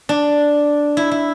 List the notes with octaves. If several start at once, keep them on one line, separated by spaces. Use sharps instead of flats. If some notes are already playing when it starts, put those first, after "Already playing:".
D4
E4
E4